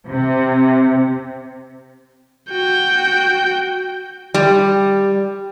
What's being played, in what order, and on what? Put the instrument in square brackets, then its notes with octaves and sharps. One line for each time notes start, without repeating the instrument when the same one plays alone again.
[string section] C3
[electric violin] F#4 G5
[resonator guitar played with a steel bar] G3